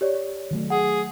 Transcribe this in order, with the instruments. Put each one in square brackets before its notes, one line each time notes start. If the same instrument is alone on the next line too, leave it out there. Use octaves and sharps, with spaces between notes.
[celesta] G4 C#5 D5
[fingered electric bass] D#3 F#3 A3
[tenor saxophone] G#4 [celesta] F#5